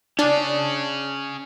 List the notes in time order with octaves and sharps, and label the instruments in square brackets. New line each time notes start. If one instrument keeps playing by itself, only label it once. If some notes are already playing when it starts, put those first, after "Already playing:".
[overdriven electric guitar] C#4 G#4 [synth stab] D4